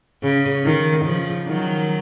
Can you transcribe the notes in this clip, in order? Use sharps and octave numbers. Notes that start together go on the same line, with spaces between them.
C#3
D#3
C#3 F3
D#3 F#3